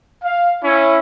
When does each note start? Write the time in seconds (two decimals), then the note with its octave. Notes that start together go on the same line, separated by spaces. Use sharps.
0.24 F5
0.64 C#4 E4